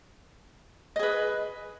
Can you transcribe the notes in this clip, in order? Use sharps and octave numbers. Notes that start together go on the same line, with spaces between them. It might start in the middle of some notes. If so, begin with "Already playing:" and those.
G#4 B4 D#5